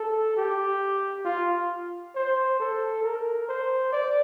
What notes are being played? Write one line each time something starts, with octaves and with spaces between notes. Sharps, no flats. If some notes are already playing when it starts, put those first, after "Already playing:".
Already playing: A4
G4
F4
C5
A4
A#4
C5
D5